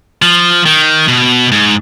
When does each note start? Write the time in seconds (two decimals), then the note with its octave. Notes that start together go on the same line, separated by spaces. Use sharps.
0.22 F3
0.66 D#3
1.08 B2
1.52 G#2